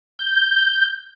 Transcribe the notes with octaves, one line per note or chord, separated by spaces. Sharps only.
G6